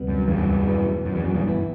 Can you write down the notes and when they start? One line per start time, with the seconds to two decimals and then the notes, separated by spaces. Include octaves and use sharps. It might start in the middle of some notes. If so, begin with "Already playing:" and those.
Already playing: D2 C3 G3 B3
0.08 F#2
0.28 E2 G2
0.67 B2 F#3 B3 E4
1.05 F#2
1.15 E2
1.24 F#2
1.34 E2 G2
1.44 G1 F#2 E3 B3 E4